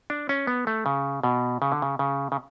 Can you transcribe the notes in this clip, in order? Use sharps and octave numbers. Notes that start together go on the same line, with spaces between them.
D4
C#4
B3
A3
C#3
B2
C#3
D3
C#3
C#3
C#3